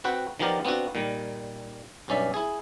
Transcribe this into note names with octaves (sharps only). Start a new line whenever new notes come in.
C4 F#4 B4 F#5 G5
D#3 F3 B3 G4 A#4 D5
B3 C4 D4 F4 F#4
A#2 D#3 G3
B1 G2 C#4 D5 E5
E4 G#4